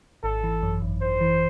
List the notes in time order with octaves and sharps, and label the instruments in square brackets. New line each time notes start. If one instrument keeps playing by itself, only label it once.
[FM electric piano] G#1 [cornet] A4
[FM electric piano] E3
F#2
G#1
[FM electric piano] G#1 [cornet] C5
[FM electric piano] E3